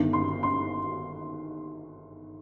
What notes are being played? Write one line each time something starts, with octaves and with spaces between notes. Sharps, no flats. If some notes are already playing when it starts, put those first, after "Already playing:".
Already playing: G1 G2 D#3
C6
C6